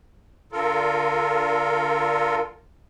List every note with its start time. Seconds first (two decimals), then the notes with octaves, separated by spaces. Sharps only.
0.52 D3 F4 A4 A#4